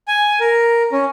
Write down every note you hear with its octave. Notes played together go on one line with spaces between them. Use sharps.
G#5
A#4
C#4